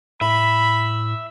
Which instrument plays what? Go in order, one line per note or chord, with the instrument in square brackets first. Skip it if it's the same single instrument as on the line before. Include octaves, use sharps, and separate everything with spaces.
[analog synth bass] A2 [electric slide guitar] E5 [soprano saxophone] B5